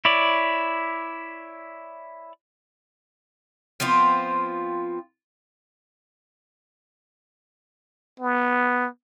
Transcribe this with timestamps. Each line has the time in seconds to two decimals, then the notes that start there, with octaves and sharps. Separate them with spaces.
0.05 E4 C#5 D5
3.80 F3 B3 C4 F4
8.20 B3